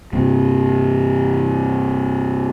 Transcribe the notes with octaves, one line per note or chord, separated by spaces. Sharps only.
G2 C3